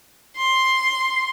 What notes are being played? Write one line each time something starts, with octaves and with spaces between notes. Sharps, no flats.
C6